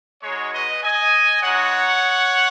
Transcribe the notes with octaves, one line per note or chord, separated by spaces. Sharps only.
G#3 D#4 F#4 G#4 C#5
B4 D#5
D#5 G#5
G#3 D#4 F#4 C#5 F#5